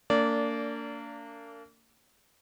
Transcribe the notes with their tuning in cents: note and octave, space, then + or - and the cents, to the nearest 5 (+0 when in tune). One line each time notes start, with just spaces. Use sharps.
A#3 -35 D4 -30 D5 -20